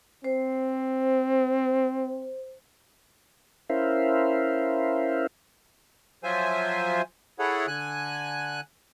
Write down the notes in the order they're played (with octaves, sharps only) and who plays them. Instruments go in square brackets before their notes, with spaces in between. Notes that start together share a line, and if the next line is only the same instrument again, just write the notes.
[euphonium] C4 [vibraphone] C5
[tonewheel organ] C#4 E4 A#4 C5 E5 F5
[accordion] F3 F#3 F4 C5 E5 G#5
E4 G#4 A4 C#5 F#5
D3 G#5 F#6